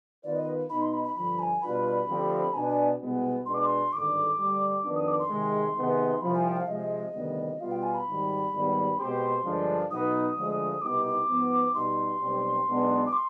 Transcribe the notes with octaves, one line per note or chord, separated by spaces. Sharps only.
D#3 B3 F4 B4 D5
D#5
B2 B3 D#4 B5
C6
B5
B5
G2 D3 F3 B5
G#5
B2 G3 D4 F4 B4 B5
D2 D3 F3 C4 G4
B2 B3 D4 G#5
G#5
C2 B2 G#3 B3
B2 G#3 B3 D4 C6
D6
C6
G#1 G2 D3 D6
D2 D3 G3
F2 D#3 B3 D4
D#6
D6
C6
C3 D#3 G#3
C3 D#3 B3 D#4 G#4
C2 C3 F3 B5
G#5
G5
F5
C3 F3 G#3 D#5
D2 C3 D#3 G3 B3
B2 G3 B3 F4 F5
G5
G#5
B5
G#1 G#2 G3
G#1 G#2 G3 B3
B2 G#3 C4 G4 C5 C6
G2 D3 F3 G#3 D4
B1 B2 B3 D#4 B4 D#6
D2 D3 F3 G#3
C2 B2 B3 D#4 G4 D6
G#2 F3 B3
B2 G3 B3 D#4 G4 C6
B1 B2 G3 C4 G4
B1 B2 G#3 B3 D4
D6
C6